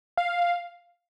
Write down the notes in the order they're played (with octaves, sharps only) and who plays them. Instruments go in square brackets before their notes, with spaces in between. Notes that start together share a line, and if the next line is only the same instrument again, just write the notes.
[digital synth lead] F5